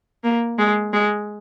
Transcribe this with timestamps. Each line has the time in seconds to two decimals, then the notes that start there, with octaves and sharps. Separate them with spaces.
0.24 A#3
0.58 G#3
0.93 G#3